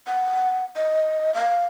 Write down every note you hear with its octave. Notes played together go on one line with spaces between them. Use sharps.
F#5
D#5
F5